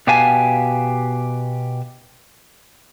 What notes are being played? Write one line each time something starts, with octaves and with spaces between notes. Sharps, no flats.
B2 G4 B4 F5 G#5 A5